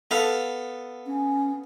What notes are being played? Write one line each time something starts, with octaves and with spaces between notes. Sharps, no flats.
B3 A4 F5
C#4